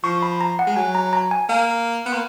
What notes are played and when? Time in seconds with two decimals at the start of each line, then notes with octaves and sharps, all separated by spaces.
0.04 F3 C#6
0.22 B5
0.41 A#5
0.59 F#5
0.67 G#3
0.76 F#3 G#5
0.95 A#5
1.13 A#5
1.31 G#5
1.49 A#3 F5
2.06 B3
2.13 A#3